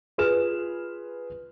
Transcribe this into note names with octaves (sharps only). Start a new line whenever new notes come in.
F4 G#4 B4 F6 E7